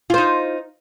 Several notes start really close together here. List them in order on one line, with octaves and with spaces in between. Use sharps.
F4 C5 D#4